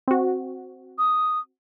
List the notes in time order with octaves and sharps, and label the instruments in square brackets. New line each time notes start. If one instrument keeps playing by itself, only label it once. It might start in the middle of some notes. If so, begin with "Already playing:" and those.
[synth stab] C4 F#4
[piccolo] D#6